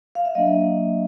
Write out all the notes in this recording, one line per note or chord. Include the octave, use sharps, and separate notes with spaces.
F5
E5
F#3 A#3 D4 D#5